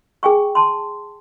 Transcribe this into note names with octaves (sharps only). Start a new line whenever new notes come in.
G#4 G5 G#5 C#6
A5 C6